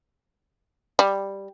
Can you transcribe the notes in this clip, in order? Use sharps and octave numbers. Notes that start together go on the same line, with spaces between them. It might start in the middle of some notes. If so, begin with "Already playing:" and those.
G3